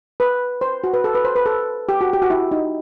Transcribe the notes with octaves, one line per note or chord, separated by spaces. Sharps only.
B4
C5
F#4
B4
A4
B4
C5
B4
A4
G4
F#4
G4
F#4
E4
D#4